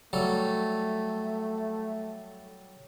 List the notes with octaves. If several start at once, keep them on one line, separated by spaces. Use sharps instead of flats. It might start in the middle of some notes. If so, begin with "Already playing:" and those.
F#3 G3 A3 A4